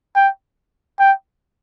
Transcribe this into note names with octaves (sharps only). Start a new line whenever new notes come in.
G5
G5